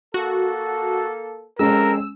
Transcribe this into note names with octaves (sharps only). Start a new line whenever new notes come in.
A#3 F#4 A4
F2 G#3 C#4 A#4 E6